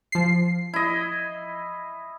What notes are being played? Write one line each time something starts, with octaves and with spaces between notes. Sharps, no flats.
F3 C7
E4 D#5